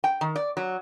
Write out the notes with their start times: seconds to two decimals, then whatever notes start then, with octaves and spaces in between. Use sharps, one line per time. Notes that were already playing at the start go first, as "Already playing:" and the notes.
0.04 G5
0.21 D#3
0.36 D5
0.57 F#3